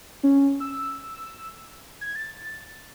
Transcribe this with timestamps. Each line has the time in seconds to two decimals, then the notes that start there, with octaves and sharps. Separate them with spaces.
0.23 C#4
0.60 E6
2.01 G#6
2.16 A6